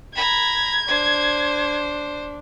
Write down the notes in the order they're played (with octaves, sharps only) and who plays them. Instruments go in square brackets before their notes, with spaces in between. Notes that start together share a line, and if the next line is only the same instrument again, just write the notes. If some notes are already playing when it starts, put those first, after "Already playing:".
[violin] A#5 B5 [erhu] G#6
[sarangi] D4 [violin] C5